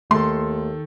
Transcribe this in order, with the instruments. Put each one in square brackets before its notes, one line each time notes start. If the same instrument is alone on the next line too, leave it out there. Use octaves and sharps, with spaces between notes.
[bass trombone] D#2 [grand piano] D#3 A4 [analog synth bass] A3 [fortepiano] C6